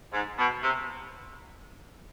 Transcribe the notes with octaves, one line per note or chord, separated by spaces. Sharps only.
G#2
B2
C3